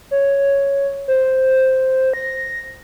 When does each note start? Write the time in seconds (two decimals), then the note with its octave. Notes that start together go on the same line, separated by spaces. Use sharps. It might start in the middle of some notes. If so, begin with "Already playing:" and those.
0.11 C#5
1.08 C5
2.14 A#6